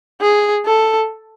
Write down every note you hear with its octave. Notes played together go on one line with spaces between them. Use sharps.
G#4
A4